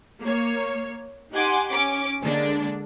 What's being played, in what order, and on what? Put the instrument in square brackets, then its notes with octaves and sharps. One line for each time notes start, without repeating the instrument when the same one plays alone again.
[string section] A#3 C#5
D#4 G4 F#5 G#5 C6 D6
C#4 D6
D3 G#3 A#3 D4